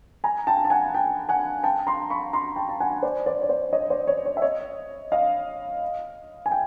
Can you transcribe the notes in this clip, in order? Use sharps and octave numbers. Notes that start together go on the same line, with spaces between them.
G#5 A#5
G5 A5
A5
F#5 G#5
G5 A5
F#5 G#5
G5 A5
A#5 C6
B5 C#6
A#5 C6
G5 A5
A5
F#5 G#5
C5 D5
C5 D5
C#5
C5 D5
C#5 D#5
C5 D5
C#5
C#5
E5
C#5 D#5
D#5 F5
G#5
G5